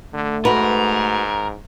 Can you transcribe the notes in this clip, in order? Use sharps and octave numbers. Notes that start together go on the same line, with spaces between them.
D3 A3
G#2 F#4 A#4 B4